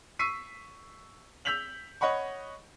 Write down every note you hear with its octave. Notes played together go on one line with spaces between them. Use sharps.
C#6 E6 B6 C7 D#7
E6 G6 B6 F7 F#7
C#5 D#5 F#5 B5 C#6